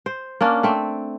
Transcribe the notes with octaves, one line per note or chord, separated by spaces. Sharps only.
C5
A#3 C#4 D4
A3 C4